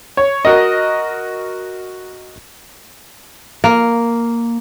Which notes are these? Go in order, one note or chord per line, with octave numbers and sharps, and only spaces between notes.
C#5
F#4 A#4 D#5
A#3